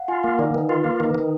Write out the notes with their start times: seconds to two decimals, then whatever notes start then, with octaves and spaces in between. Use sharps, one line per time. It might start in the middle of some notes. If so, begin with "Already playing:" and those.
Already playing: F5 F#5
0.08 F4 G#5
0.23 A#3 F5
0.39 D#3 D5
0.54 D#3 B4
0.69 F4 B4
0.84 A#3
0.90 A#4
1.00 D#3
1.10 B4
1.15 D#3